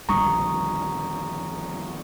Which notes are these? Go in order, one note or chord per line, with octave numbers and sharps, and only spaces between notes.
A#1 F2 D3 D#3 G3 A#5 C#6 D#6